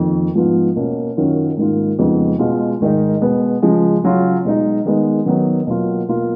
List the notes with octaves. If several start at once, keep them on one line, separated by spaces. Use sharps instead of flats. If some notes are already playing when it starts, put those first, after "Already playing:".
Already playing: F2 D#3 A#3
G#2 F3 B3 F4
B2 A#3 C#4
F#2 D#3 F#3 C#4 F4
G#2 D#3 A#3 F4
F2 C#3 G#3 B3 D#4
B2 G#3 B3 F4
G#2 D#3 G#3 D#4
B2 G#3 B3
C#3 F3 G#3
C#3 F#3 C#4 F4
B2 G#3 D#4
D#3 G#3 B3 D#4
D#3 F#3 B3 D#4
B2 F#3 A#3 F4
B2 A#3 F4